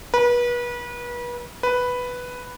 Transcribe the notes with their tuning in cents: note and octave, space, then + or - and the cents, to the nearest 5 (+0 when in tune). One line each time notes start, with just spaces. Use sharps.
B4 -35
B4 +0